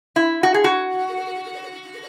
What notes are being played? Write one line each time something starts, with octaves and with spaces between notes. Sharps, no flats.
E4
F#4
G#4
F#4